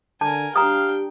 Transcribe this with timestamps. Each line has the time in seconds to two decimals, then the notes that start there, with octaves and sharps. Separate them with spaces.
0.21 D3 A#4 G#5 A5
0.56 D4 G4 F5 G5 A#5 D#6